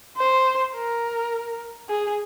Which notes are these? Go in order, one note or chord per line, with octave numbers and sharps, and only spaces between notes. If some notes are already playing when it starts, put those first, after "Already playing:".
C5
A#4
G#4